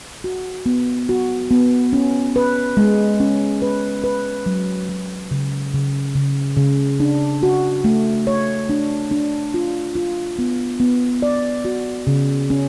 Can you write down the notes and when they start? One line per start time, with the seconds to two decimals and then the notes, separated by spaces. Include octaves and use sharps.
0.24 F#4
0.66 B3
1.09 F#4
1.51 B3
1.93 C#4
2.36 B4
2.77 G#3
3.20 C#4
3.62 B4
4.04 B4
4.46 F#3
4.89 F#3
5.31 C#3
5.74 C#3
6.15 C#3
6.57 C#3
7.00 D4
7.43 F#4
7.84 A3
8.27 C#5
8.70 D4
9.11 D4
9.54 F4
9.95 F4
10.39 B3
10.80 B3
11.22 D5
11.65 F#4
12.07 C#3
12.50 C#4